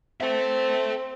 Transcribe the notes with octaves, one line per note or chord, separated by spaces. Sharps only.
C4 A4 E5